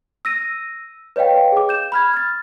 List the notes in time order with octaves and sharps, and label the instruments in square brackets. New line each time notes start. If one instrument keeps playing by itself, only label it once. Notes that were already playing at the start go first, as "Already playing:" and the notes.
[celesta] E6 A#6 D#7
B4 C#5 D#5 F5 G5
G#4 D6
G6 E7
B5 F6 G#6
F6 A6